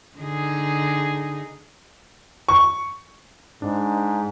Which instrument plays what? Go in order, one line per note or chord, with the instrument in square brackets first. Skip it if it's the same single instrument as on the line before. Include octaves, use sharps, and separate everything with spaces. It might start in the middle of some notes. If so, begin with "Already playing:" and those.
[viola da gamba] D3 D#4 G#4
[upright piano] C#6
[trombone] G#2 [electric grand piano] D4